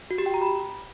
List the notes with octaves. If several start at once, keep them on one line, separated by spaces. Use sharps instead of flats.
F#4
G4
G5
A#5
B5